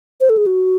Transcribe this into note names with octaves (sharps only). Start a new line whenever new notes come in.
C5
A4
G#4
F#4